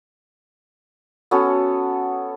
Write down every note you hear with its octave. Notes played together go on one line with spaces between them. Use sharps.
B3 C#4 F#4 A4